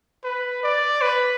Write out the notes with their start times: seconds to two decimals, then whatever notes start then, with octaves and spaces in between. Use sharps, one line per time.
0.24 B4
0.63 D5
1.02 B4